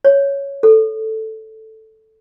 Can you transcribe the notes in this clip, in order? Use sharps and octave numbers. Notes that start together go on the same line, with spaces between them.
C#5
A4